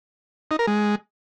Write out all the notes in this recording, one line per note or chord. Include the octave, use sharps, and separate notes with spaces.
D#4
A#4
G#3